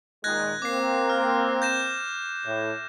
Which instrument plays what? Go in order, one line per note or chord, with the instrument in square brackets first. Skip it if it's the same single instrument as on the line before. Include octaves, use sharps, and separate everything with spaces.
[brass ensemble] A#2 D#3 G#3 [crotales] F#6 G#6 A#6
[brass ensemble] A#3 C4 [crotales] D6 C7
[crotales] F6
G6 A#6 E7
[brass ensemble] A2